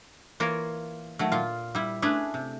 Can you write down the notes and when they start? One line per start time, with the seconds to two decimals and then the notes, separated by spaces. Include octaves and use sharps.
0.40 E3 A#3 F4 A#4 C#5
1.19 D#3 F#3 A3
1.32 A#2 F4
1.75 G3 E4
2.02 A3 C#4 D4 G#4 B4
2.34 C3